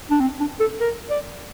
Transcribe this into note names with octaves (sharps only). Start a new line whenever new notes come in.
D4
C4
D4
A4
A#4
D5